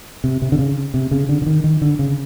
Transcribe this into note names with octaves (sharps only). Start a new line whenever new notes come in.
C3
C3
D3
C#3
C3
C#3
D3
D3
D#3
D#3
D3
C#3